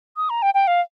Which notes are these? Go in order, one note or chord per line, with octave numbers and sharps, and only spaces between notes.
D#6
A#5
G5
G5
F5